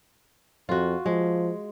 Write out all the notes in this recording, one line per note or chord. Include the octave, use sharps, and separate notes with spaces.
F2 F4 F#4
F3 G#3